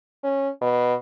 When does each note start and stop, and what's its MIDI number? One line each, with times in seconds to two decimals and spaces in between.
0.23 0.49 61
0.61 0.94 47